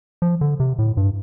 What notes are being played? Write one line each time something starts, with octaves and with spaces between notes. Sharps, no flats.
F3
D3
C3
A2
G2